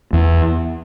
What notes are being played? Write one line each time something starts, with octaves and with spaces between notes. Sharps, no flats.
E2